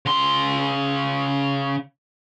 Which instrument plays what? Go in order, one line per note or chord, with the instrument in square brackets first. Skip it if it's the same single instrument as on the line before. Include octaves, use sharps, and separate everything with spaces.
[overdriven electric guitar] C#3 C6